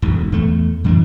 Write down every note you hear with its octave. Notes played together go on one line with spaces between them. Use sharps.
E1 D2 G#2
E2 A3
F#2 E3 C#4 D4